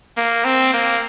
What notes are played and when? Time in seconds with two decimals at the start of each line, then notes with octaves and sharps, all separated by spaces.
0.17 A#3
0.44 C4
0.73 A#3